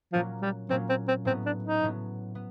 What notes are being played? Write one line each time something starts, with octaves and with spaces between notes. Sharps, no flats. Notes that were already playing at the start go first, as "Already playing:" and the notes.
A#2 F3 F#3 A#3 C#4
G3
A#2 F#3 A#3 C4 C#4
C4
C4
A2 F#3 B3 C4
D4
D#4
A2 F#3 B3
B3